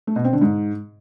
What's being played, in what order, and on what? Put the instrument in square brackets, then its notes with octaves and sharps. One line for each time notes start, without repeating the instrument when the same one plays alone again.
[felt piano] A3
B2
C4
D3
G#2